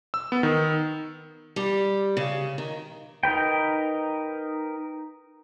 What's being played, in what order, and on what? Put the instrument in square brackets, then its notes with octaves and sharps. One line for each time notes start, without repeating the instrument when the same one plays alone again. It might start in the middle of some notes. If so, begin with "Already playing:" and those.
[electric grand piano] E6
B3
D#3
[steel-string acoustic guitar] G3
C#3
D#3
[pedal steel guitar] D#4 A#4 B4 G5